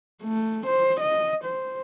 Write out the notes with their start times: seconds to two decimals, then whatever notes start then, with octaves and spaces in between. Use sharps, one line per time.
0.22 A3
0.66 C5
1.00 D#5
1.44 C5